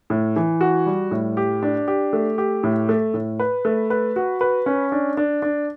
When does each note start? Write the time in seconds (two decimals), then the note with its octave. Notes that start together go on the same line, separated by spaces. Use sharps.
0.10 A2
0.36 E3
0.61 F#4
0.86 G3
1.11 A2
1.37 G4
1.63 D4
1.88 G4
2.13 A3
2.38 G4
2.63 A2
2.89 A3
3.14 A2
3.40 B4
3.65 A3
3.90 B4
4.16 F#4
4.41 B4
4.66 C#4
4.92 D4
5.17 D4
5.42 D4